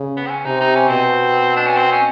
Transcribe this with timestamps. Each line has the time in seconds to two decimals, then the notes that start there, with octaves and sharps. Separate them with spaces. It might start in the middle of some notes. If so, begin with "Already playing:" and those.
Already playing: C#3
0.17 B3
0.26 C4
0.31 C#4
0.45 C3 D#4
0.61 D#4
0.75 C#4
0.89 B2 C4
1.57 D4
1.67 C#4
1.77 C4
1.92 C#4